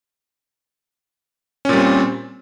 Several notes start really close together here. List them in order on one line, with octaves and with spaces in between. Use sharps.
C#4 A#2 G3 C4